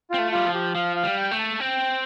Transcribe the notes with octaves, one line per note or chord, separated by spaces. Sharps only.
C4 F4
A3
G3 F4
F3
G4
F3 F5
F5
G3
G5
A3
A5
C4 G5